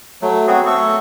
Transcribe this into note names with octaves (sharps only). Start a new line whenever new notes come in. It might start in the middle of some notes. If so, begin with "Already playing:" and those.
F#3 A3
B3 C4 F#4 G#4
A3 A4 C#6